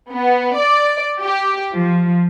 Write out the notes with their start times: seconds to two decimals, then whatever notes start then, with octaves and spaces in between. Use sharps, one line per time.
0.12 B3
0.58 D5
1.20 G4
1.76 F3